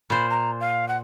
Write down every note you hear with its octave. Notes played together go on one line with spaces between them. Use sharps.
A#2 C5 B5
A#5
F5
F#5